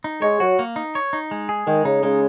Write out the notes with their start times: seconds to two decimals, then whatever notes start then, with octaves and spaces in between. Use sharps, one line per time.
0.04 D#4
0.22 G#3 C#5
0.40 F#3 F#4
0.59 A#3
0.76 D#4
0.95 C#5
1.13 D#4
1.31 G#3
1.49 G#4
1.67 D#3 G#3
1.85 C#3 D#4
2.03 C#3 G#3